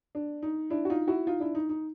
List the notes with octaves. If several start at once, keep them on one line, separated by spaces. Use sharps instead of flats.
D4
D#4
D4 E4
F#4
D#4 F4
E4 F#4
D#4 F4
D4 E4
D#4
D#4